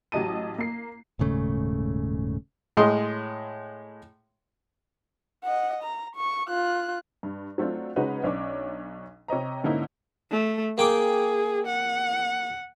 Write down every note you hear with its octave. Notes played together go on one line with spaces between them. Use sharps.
A1 F#3 G4 D#5 A5 D#7
A#3 C7
D#1 G#2 C#3 A3
A2 G#3 C6 D#6
D#5 F#5
A#5
C#6
F4 F#6
G2
F#3 A3 C4 D4 F4
C#3 G#3 C#4 D#4 F#4 B4
B1 C#4 D4 C#5 D6
C3 C#5 D#5 A#5
G#2 D3 A#3 C#4 D#4 E4
A3
A#3 G#4 G5 D6
F#5